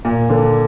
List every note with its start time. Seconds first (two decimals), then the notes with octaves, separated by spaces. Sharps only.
0.05 A#2
0.29 D3